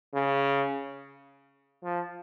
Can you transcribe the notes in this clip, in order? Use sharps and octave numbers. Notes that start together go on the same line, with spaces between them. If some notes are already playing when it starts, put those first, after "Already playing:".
C#3
F3